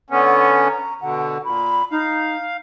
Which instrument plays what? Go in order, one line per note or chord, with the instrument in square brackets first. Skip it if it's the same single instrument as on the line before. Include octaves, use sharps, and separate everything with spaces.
[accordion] D3 B3 C#4
[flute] A#5
[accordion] B2 D3 [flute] F#5
[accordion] A#2 [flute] B5
[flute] D#4 [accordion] F5